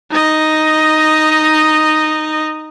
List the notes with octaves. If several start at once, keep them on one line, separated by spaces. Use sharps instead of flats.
D#4 D#5